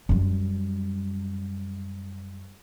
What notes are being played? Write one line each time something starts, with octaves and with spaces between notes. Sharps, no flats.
F#2 G3